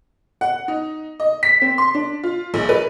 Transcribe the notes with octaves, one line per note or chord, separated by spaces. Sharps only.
F#5
D#4
D#5
B6
C4
C6
D4
F4
A#1
B4